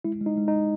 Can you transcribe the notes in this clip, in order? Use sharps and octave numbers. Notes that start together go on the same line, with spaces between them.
G#3 E4
G#3
D#4
G#3
D#4